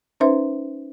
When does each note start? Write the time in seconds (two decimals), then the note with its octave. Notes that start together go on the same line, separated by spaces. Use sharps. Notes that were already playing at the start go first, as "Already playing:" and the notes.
0.20 C#4 D#4 B4 C5 E5 C6